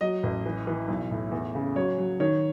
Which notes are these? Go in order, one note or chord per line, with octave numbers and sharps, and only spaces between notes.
F#3 D#5
A1
E3
E3
B1
A2
E2
C#3
F#3 C#5
F#3
D#3 C#5